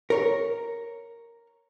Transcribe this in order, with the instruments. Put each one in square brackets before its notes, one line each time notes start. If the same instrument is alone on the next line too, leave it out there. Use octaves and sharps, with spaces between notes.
[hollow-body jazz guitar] A#4 C#5